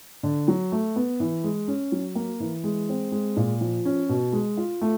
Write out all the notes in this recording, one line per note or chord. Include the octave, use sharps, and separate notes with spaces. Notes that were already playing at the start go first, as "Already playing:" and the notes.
D3
F#3
A3
B3
E3
G#3
C#4
F#3
A#3
E3
G#3
C4
G#3
A#2
F3
C#4
B2
G#3
F4
A3